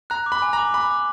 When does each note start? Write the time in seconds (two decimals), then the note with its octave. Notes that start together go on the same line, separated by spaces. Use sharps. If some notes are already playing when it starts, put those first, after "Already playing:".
0.10 A#5 F#6
0.26 D6
0.32 B5
0.42 G#5
0.53 A#5
0.58 D6
0.74 B5 D6
0.91 D6